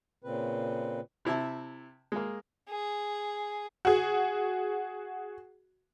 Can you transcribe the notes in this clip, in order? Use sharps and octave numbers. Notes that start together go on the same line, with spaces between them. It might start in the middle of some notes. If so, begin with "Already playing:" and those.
A#2 C#3 C4 B4
C3 E4 E5 A5
G#3 A#3
G#4
F#4 G#4